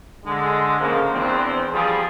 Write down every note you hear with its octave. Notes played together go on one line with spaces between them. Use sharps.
D3 G#3
C#3 F3 A#3
E2 C4 D4
F3 G3 G#4